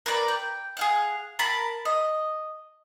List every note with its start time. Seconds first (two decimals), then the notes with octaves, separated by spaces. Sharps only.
0.06 A#4 B4 D5
0.28 G5
0.77 G#4 F5 F#5
1.39 A#4 A5 B5
1.85 D#5